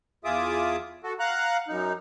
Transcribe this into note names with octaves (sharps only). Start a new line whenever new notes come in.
E2 F4 G#4 E5 D6 D#6
F#4 A4
F5 F#5 A#5 F#6
F#2 D#4